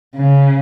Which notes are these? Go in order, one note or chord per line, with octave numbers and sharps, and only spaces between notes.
C#3